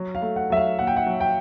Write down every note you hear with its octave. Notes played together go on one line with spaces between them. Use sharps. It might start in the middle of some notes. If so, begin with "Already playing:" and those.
Already playing: F#3
F5
A3
F#5
F#3 E5
F5
A#2 F#5
G5
F#5
F#3
G5